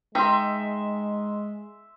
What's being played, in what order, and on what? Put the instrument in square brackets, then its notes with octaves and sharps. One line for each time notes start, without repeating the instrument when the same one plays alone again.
[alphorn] G#3 [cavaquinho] D#4 G5 [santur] E5 C6